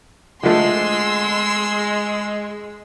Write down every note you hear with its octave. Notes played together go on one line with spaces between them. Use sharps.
D3 F3 G#3 A3 C6 E6